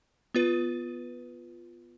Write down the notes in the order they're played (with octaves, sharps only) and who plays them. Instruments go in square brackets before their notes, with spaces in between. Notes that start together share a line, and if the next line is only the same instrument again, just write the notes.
[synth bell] B3 F4 B4